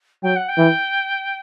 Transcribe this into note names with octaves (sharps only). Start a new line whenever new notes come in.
F#3 G5
F#5
G5
E3